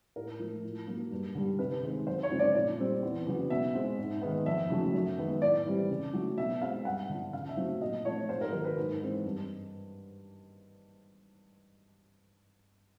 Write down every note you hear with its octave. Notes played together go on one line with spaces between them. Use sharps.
A2 A#4
F3 A3
A2
F#3 A#3
G2
D3 G3
C3 B4
D#3 G#3 C4
F#2 C5
C#5
C#3 F3 G#3 C4
D5
A#2 D5
G3 C4
E2
C#3 F#3 B3
B2 E5
G#3 C4
G#2
D#3 G#3 B3
F2 E5
C#3 F#3 A3
F#2
D#3 G#3 B3
A2 D5
E3 G3 C4
C#3
F#3 A3
B2 E5
G#3 C4 F5
G2 F#5
D3 F3
C#3 F5
E5
F#3 A3 C4
A#2 D#5
F3 A3 C4 C#5
G#2 C5
A#4
D#3 F#3 A#4
B4
G#2
E3 G#3 C4
G2